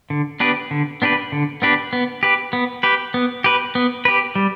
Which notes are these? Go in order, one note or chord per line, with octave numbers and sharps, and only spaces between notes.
D3
B3 D4 G4 B4
D3
B3 D4 G4 B4
D3
B3 D4 G4 B4
B3
G4 B4
B3
G4 B4
B3
G4 B4
B3
G4 B4
G3